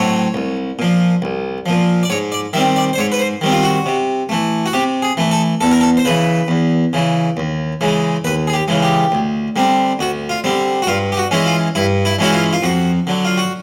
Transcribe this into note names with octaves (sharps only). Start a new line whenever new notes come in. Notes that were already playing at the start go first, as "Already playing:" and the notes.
Already playing: A2 F#3 A3 C4 C#5
C2
A#2 F3
C2
A#2 F3
D5
G#2 C#5
D5
D#3 G3 C4 E5
D5
C5
G#2 C#5
B4
C5
D#3 G3 C4
F4
F#4
C3
E3 A3
F#4
C3 G4
G#4
E3 A3
A4
E2 A4
A#4
A4
C5
C#3 E3 B4
E2
C#3 E3
D#2
C#3 E3 G#3
D#2 B4
G#4
G4
C#3 E3 G#3
G4
D2
D3 G3 C4
D2 F#4
F4
D3 G3 C4
F#4
G2 F4
G4
F#4
E3 G#3 C#4 E4
F4
G2 E4
E4
E3 G#3 C#4 E4 F#4
F4
F4
F2 F#4
D3 F#3
F4
F#4